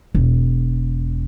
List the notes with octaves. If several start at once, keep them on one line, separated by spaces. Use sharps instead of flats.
E1